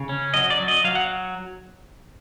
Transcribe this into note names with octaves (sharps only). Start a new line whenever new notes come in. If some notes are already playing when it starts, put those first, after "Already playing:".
Already playing: C#3
C#4
F#3 D#5
D5
F#3
D#5
F#3 F5
F#5